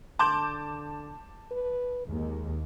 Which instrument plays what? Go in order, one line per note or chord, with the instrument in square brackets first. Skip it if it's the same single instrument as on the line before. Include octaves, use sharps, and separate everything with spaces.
[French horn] D3 [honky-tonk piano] A5 D6 G6 [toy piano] C6
[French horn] B4
[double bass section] D#2 [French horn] G#3